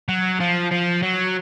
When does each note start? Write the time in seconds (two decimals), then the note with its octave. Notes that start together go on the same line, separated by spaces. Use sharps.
0.09 F#3
0.40 F3
0.71 F3
1.03 F#3